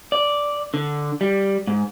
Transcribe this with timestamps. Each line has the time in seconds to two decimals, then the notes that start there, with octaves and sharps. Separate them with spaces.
0.12 D5
0.74 D3
1.21 G3
1.67 G#2